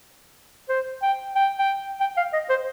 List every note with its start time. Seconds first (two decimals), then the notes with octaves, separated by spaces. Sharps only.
0.69 C5
1.02 G5
1.35 G5
1.59 G5
2.00 G5
2.17 F5
2.33 D#5
2.49 C5